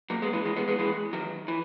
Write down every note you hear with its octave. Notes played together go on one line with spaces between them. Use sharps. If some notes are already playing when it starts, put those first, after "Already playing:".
F#3 A#3
G#3 B3
E3 G#3
E3 G#3
G#3 B3
G#3 B3
E3 G#3
D#3 F#3
E3